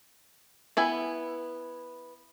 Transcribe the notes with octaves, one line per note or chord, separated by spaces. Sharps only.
B3 E4 G#5